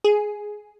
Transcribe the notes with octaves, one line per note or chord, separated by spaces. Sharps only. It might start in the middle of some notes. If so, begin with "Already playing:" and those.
G#4